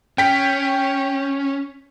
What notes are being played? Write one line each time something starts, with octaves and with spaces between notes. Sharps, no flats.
C#4 G5 B6